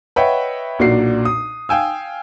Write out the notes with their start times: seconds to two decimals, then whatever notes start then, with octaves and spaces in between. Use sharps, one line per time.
0.16 B4 C#5 D#5 E5 F#5 G5
0.79 B1 A#2 D4 F#4 C7
1.25 D#6
1.69 F5 G5 G#5 E6